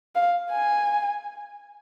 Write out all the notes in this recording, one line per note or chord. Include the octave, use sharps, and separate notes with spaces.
F5
G#5